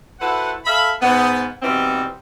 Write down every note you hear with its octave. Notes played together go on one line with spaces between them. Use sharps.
E4 F#4 A4 B4 C5 F#5
A4 E5 F5 B5
G#2 B3
B2 E3 G3 C4 D#4